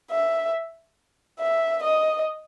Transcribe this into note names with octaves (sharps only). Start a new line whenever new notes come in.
E5
E5
D#5